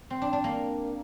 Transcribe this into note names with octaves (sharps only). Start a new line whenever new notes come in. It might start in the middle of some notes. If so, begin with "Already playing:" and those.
C4
D4
D4
A#3